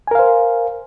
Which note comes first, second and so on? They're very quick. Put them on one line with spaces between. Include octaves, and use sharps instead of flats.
G#5 A#4 F5 C5